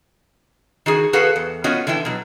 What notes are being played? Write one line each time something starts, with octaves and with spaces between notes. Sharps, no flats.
D#3 F#4 G#4
F#4 G#4 A4 B4 F5 F#5
E2
B3 C#4 F4 F#4 C#5 D#5
D3 E3 E4 G5
B2 F#3